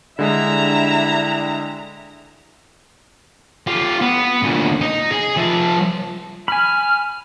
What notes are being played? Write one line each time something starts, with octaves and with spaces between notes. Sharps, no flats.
D3 G3 G#3 D4 E4 E5 A#5
F4 G4
B3
D2 A#2
D#4
G#4
F3 E5
G#5 B5 F6